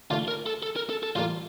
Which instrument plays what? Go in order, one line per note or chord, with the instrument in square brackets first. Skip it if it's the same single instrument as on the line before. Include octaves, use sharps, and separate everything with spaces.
[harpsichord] D#2 D3 A3 [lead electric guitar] F4
[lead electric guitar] A#4
A4
A4
A#4
A4
A4
[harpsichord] A1 A2 G3 A#3 [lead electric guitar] F4